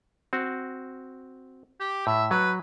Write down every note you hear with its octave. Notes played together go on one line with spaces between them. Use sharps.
C4 F#4
G4
A2 E5
F#3 B4